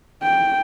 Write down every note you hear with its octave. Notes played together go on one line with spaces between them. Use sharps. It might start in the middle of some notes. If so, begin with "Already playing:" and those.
G5